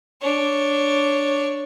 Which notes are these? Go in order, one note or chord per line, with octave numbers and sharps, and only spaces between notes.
D4 C#5